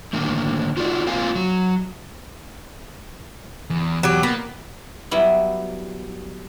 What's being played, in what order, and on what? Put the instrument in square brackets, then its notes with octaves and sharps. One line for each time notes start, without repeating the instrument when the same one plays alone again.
[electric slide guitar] A2 D3 D#3 A#3
D#4 F4 F#4 A4 D5
A#3 C4 F4 F5 G#5
F#3
[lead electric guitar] E2
[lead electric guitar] E2 [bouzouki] F#3 G4
[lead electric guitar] A#3 [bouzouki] B3
[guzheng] F#3 G3 B3 E4